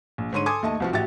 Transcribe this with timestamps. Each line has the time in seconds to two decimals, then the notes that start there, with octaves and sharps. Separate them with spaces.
0.18 A#1
0.32 G#2 D3 C#5 C6 D#7
0.46 A4 G#5 C6 D6 D#6 G#6
0.62 D#2 A3 D#5 A5
0.80 C2 F3 F#4
0.93 A1 F#4 G4 E5 A6